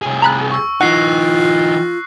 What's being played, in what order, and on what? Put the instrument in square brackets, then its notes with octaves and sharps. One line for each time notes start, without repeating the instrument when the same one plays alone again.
[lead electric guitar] C2 G#4
[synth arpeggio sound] A#5 B5 F#6
[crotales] C#6 E6
[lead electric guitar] E3 D#4 [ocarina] F4 [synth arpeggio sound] F#5 [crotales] F#6 A#6 C7